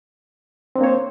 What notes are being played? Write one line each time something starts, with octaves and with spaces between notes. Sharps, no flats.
A#3 C4 D4 C5 C#5